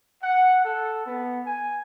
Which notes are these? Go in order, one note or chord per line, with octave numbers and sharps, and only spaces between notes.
F#5
A4
B3
G#5